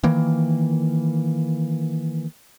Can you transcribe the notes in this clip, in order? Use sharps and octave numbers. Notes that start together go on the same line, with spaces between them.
D#3 E3 A#3